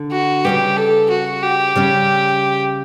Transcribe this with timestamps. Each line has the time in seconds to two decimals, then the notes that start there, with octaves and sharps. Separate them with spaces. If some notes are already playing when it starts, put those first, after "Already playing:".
Already playing: D3
0.12 F#4
0.45 C#3 G3 B3 G4
0.77 A4
1.10 F#4
1.43 G4
1.76 C#3 G3 C#4